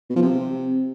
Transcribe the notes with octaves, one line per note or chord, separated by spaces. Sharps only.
B2
F3
C3